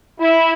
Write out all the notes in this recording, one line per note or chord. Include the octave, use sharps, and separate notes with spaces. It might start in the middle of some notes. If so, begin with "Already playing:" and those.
E4